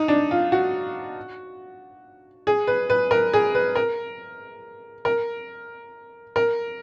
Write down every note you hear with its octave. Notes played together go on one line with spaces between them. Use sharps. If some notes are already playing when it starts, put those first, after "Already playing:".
Already playing: D#4
D4
F4
F#4
G#4
B4
B4
A#4
G#4
B4
A#4
A#4
A#4